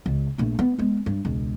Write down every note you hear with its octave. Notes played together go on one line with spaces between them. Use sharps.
C#2
A#1 A3
B3
G#3 B3
G2
E1 C#2